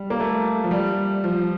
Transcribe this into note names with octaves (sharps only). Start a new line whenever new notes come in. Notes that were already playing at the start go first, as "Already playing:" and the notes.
Already playing: G3
A#3
A3
F3
G3
F3